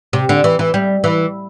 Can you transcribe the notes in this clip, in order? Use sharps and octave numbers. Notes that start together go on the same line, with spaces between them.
C3
D3
E3
E3
G3
E3